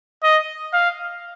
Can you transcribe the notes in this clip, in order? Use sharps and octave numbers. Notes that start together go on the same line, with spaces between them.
D#5
F5